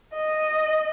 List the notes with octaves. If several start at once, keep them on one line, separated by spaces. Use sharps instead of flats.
D#5